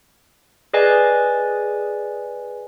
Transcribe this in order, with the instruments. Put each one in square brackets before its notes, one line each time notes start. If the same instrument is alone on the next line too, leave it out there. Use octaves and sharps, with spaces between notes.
[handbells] G#4 B4 D5 D#5 G#5